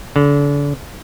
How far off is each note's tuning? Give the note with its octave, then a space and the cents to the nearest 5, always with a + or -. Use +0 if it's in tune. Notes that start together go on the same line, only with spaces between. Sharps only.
D3 -35